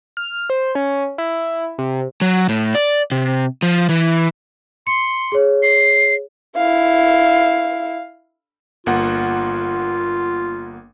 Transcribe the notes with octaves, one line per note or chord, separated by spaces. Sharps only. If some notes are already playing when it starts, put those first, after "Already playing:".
F6
C5
C#4
E4
C3
F#3
A2
D5
C3
F3
E3
C6 C#7
G#4 C#5
C7
E4 F5
G1 A#3 F4 F#5